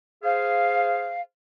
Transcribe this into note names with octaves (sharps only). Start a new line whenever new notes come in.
G#4 C5 F5